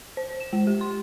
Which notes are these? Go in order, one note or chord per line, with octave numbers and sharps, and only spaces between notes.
C5
E7
G#3
G4
C6